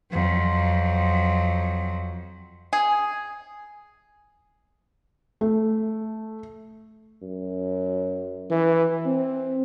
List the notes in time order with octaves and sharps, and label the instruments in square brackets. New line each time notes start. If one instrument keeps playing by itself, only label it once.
[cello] F2 F#3
[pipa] G#4
[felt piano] A3
[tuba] F#2
E3
C4